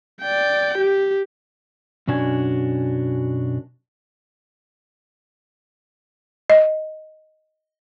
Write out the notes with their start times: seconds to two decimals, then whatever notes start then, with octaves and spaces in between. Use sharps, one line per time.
0.21 D5 G5
0.78 G4
2.07 F#2 B2 C#4 D4 F#4 G#5
6.50 D#5